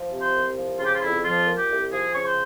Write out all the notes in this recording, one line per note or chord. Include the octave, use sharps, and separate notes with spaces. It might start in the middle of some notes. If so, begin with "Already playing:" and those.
Already playing: F3
C3
C5
C2
F3
C#3 F4
G4
F4
F2 E4
F3 F4
A#2
G4
C2
F3 G#4
C#3 C#5
C5